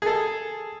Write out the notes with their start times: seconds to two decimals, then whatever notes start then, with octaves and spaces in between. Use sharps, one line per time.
0.02 G#4 A4